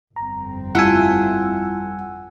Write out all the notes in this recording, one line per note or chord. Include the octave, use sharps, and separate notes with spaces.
G1 F2 C4 A#5
G3 A3 E4 F4 F#5 G#5 E6